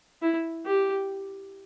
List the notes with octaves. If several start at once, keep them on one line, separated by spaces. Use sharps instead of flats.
E4
G4